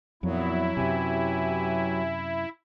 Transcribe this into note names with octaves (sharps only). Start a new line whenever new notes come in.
F2 A#2 F#3 B3 E4
F#2 C3 G4 B4 G#5